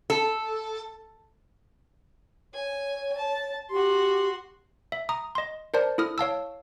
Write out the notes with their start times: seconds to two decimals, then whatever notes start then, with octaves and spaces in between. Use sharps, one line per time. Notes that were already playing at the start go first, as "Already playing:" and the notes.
0.10 A4
2.54 C#5 G#5
3.17 A5
3.70 F#4 G4 C6
4.92 E5
5.09 A#5 D#6
5.35 D#5 C6
5.74 A#4 C5 D5 A5
5.98 E4 A4 D#6 F6
6.18 C#5 F5 A5 E6